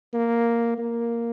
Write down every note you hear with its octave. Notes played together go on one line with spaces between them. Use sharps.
A#3
A#3